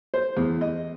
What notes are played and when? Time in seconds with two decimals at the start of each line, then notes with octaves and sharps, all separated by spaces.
0.14 C5
0.37 E2
0.61 D#5